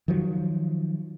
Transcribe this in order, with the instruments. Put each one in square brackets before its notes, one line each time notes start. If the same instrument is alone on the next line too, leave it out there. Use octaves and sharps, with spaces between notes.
[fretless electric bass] D#3 F3 F#3